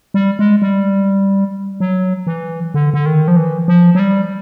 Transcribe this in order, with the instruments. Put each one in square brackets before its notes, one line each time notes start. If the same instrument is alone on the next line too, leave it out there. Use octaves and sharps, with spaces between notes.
[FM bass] G3
G#3
G3
F#3
E3
D3
D3
D#3
F3
E3
F3
F#3
G3